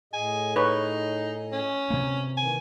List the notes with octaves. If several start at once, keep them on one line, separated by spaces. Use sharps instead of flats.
A2 G#4 D#5 G#5
D#4 B4 C#5
C#4
C3 A#3
D#3 E3 G#5